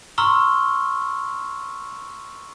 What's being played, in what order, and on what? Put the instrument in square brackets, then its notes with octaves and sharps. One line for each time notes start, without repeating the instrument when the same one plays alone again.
[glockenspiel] A#5 C6 C#6 E6 F6 G7